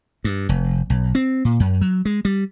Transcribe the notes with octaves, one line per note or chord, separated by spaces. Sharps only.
G2
F1
B1
C4
A#2
F#2
F#3
G#3
G3